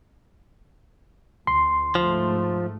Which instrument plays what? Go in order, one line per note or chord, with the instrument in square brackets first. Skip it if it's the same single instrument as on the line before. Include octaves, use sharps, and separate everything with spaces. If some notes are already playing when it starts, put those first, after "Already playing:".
[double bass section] D2 [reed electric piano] C6
[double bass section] G#2 A3 [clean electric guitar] F3